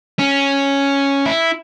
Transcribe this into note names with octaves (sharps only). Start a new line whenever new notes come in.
C#4
E4